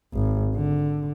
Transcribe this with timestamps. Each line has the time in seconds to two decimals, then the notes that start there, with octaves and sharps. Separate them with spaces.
0.14 G#1
0.55 D3